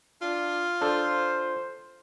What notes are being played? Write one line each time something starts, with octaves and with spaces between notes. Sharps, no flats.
D4 F4
D4 A4 C5